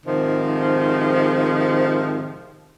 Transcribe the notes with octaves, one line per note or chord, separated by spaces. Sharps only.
G#2 C3 D#3 F3